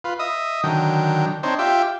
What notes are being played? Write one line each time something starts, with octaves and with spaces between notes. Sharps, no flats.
F4 B4
D#5 E5 D#6
D3 D#3 F#3 G5
C4 D4 D#4 C5 C#5
F4 G4 E5 G5